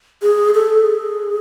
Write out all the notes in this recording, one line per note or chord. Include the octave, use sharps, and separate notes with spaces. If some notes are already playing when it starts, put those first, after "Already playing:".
G#4
A4
G#4